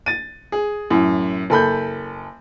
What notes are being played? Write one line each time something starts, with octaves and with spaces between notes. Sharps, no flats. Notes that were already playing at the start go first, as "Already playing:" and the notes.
A6 D#7
G#4
F#2 A2
F#1 A4 B5 G6